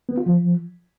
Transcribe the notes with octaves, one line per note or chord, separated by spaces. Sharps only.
B3
F4
F3